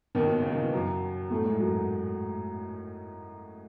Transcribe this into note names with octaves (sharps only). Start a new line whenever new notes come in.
D#2 D#3
B2
C#3
D#3
E3
F#2 F#3
A2 A3
G#2 G#3
F#2 F#3